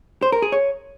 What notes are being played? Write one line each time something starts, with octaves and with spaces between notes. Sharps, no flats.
C5
A#4
G#4
C#5